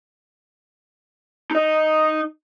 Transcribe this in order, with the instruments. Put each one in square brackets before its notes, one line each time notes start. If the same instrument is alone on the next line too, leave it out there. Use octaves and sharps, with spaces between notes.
[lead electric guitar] D#4 D#5